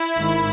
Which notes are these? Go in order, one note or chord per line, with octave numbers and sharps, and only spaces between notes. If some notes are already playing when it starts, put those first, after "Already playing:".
Already playing: E4
G#1 G#2 D#3